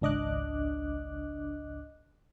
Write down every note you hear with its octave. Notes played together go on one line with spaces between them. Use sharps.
G#1 C#2 D4 D#5 D6 F#6